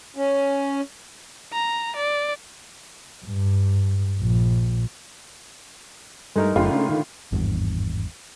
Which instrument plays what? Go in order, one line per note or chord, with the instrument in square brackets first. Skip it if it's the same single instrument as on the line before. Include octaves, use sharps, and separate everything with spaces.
[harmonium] C#4
[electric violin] A#5
D5
[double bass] G2
A#1
[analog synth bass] G2 [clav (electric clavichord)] G#3 D#4 A#4 [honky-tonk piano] A3
[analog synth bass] F#1 [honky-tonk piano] A2 D3 F4
[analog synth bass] C#3
D#3
[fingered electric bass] G#1 E2 G2